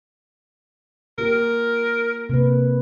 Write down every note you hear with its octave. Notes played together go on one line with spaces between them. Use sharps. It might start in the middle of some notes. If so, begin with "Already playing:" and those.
A#3 F4 G4 A#4
C3 A#3 B4